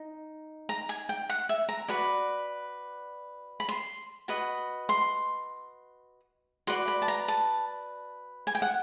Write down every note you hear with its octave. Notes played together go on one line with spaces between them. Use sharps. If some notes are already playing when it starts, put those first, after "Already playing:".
Already playing: D#4
A#5
G#5
G5
F#5
E5
A#5
F#4 B4 D5 B5
B5
C6
F#4 B4 D#5
C6
F#4 B4 D5 C6
B5
A5
A#5
A5
G#5
G5
F#5